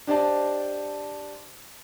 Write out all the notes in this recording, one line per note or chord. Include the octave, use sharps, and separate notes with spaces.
D4 G4 C5 D5 D#5 A5